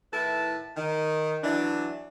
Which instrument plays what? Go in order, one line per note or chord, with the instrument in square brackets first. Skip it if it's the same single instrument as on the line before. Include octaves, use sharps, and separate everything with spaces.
[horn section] A2 D#3 E4 B4 A5
D#3
E3 F#3 D4